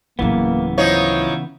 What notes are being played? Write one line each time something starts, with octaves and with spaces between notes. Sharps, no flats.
D1 C#3 E3 F#3 A#3 B3
F3 D#4 E4 C#5